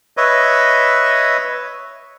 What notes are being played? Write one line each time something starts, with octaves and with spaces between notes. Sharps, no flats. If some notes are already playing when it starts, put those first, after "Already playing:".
B4 C#5 D#5 E5